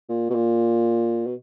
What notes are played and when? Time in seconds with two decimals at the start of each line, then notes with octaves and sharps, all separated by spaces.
0.09 A#2
0.30 B2
0.35 A#2
1.26 B2